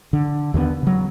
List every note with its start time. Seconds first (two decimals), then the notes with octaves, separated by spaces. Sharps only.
0.13 D3
0.54 D#2 D3 D#3 B3
0.83 C#3 F#3